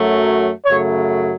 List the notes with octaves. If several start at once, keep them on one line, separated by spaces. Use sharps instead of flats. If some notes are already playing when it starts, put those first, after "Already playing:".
Already playing: F#2 F#3 A3
F#2 C#3 F#3 A3 C#5